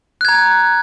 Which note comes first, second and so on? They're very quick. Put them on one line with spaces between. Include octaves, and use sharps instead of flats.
F#6 G#6 A#5